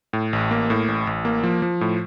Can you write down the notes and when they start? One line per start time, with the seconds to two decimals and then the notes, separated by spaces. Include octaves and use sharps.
0.13 A2
0.33 A1
0.51 A#3
0.70 A2
0.88 A1
1.07 A1
1.25 A#3
1.43 F3
1.62 F3
1.81 A2